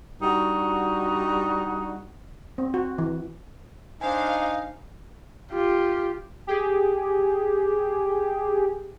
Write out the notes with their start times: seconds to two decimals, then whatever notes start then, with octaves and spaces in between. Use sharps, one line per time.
0.21 G3 D4 D#4 F#4
2.58 C4
2.74 F#4
2.98 E3
4.01 D4 D#4 C5 F5 G#5
5.53 F4 G4
6.47 G4 G#4